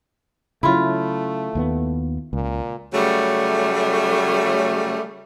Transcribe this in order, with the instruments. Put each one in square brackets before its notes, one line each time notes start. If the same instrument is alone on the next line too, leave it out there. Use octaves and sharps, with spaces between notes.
[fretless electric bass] C#3 F#3 [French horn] A3 [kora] E4 F4
[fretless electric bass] D#2 A#3 B3
[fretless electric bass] C#2 [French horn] A#2
[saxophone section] C#3 F#3 G3 A3